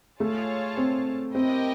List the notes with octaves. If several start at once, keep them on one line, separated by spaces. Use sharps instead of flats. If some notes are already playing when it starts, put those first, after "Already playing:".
A3 F4 G#4 C#5 F5 A5
C4
C4 E4 G4 A#4 D#5 G5